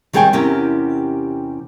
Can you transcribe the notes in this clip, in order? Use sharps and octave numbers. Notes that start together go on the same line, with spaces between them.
D#3 G3 G#4 C#5 G5 G#5
E2 C3 C#4 G4 A#4